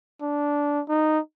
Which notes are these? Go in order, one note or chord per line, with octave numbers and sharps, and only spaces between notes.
D4
D#4